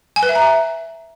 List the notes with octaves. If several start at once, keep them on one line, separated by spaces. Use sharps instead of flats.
G#5
B4
E5
A#5
E5